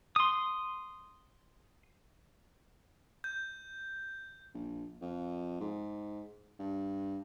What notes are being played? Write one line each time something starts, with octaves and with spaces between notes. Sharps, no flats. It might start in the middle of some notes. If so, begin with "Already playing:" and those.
C6 D#6
G6
A#1
F2
G#2
G2